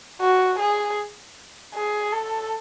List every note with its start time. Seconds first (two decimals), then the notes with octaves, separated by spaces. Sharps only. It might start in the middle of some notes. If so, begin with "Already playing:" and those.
0.21 F#4
0.59 G#4
1.74 G#4
2.12 A4